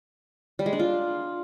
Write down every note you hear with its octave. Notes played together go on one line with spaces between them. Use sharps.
G3
G#3
D4
F4